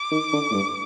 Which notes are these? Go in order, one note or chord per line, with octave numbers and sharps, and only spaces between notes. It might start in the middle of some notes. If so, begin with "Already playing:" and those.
Already playing: D6
D#3
D3
A2
G2